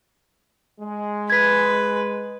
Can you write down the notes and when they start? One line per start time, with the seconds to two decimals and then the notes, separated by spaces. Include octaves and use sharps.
0.81 G#3
1.30 B4 G#6 B6